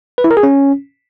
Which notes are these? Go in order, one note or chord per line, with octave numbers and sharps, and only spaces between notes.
B4
E4
A#4
G#4
C#4